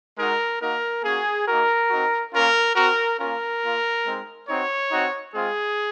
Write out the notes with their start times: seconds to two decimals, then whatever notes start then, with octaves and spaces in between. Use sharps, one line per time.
0.17 G#3 D#4 F#4 A#4
0.61 A#3 D#4 F#4 A#4
1.04 A#3 C#4 F#4 G#4
1.47 A#3 D#4 F#4 A#4
1.89 C4 D#4 F#4
2.32 A#3 C#4 F4 A#4
2.75 C4 F#4 A#4
3.19 A#3 C#4 F4 A#4
3.62 A#3 F4
4.05 G#3 C4 D#4
4.48 C4 D#4 F#4 C#5
4.92 C4 D#4 F#4
5.34 G#3 C4 F4 G#4